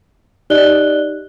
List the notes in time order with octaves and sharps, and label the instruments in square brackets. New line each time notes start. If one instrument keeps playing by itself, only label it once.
[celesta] D#4 G4 D5 D#5 F#6 G7